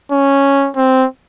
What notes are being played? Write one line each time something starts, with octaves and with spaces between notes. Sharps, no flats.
C#4
C4